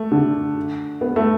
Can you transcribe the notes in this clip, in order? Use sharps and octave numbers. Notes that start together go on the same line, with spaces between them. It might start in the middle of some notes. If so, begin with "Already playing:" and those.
Already playing: A3
D3
B3
A3